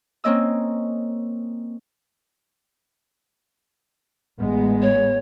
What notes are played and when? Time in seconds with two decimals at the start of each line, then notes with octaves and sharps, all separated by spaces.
0.24 A#3 C4 C#4 D#5 E6
4.39 A1 G#3 B3
4.82 C#5